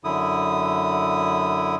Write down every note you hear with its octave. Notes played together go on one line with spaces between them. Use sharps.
F#2 D3 E4 D#6